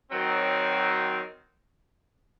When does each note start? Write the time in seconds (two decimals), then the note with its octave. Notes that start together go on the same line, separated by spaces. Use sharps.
0.11 D#3 F#3 C4